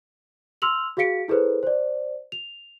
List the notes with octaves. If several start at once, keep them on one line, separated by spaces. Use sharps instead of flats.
C6 E6 F6 F7 F#7
F#4 G#4 F5 B6 C#7 D7
E4 G#4 A4 B4 C5
C5 D5
F7